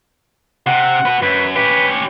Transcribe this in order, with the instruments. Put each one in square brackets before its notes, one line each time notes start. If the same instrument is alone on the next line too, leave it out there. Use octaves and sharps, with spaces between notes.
[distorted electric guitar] C3 [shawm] F#5
[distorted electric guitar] F#4 B4
[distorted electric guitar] F#2 [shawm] B4
[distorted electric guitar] C#4 G4 [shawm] B4